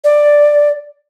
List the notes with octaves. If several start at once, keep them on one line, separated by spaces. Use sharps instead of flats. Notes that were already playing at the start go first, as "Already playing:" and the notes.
D5